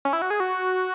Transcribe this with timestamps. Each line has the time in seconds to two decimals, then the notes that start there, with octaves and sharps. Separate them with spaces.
0.05 C#4
0.13 E4
0.22 F#4
0.30 G#4
0.40 F#4